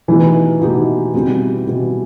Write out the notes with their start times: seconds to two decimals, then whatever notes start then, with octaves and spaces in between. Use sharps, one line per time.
0.08 B2 E3 A3 D#4 G4
0.61 B2 A3 D#4 G4
1.14 B2 G3 C4
1.67 B2 G3 C4